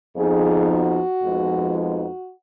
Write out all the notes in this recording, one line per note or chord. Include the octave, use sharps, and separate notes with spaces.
F2 F3 B3 D#4 G#4
F#4
F2 F3 G#3 B3 D#4
F#4